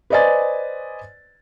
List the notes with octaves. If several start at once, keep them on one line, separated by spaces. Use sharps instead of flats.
B4 C5 D5 D#5 G#5 A6